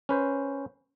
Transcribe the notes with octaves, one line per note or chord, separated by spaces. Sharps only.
C#4 B4 C5